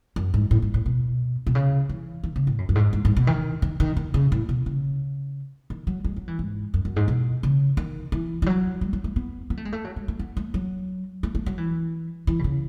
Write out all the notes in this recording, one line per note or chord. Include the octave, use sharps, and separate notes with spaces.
F#2
G#2
A2
G#2
A2
B2
B2
C#3
E3
D#3
C#3
A2
F#2
F#2
G#2
G#2
G#2
B2
D#3
D#3
D#3
D#3
C#3
A2
B2
C#3
D#3
F#3
G#3
F#3
E3
G#2
F#2
F#2
G#2
B2
C#3
D#3
E3
E3
F#3
G#3
F#3
A3
B3
B3
A3
G#3
A3
F#3
G#3
A3
B3
A3
F#3
A3
A3
F#3
E3
E3
B2
C#3